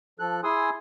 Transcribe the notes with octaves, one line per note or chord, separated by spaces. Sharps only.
F3 A4 F#6
E4 G#4 G#5 C6 D#6 E6